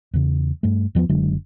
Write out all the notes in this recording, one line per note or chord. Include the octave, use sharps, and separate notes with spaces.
E2 C#3
G2 A3
E2 F3 A3 B3
F#1 D3 F#3 G#3